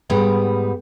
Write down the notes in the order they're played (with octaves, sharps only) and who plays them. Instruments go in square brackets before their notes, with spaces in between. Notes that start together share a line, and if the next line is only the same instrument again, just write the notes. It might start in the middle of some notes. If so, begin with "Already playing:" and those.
[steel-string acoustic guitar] G#2 G3 B3 D#4